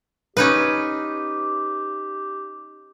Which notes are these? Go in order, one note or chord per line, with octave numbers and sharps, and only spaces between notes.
C#4 D#4 G4 B4